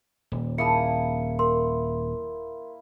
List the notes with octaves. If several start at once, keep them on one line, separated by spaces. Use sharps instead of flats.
D#1
D#3 A#3 E4 G#4 A5 D#6 C#7
A#4 C6